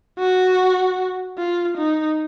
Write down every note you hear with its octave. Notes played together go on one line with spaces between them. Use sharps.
F#4
F4
D#4